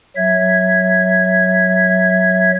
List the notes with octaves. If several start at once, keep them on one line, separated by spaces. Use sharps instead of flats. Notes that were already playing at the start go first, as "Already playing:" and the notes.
F#3 E5 G#6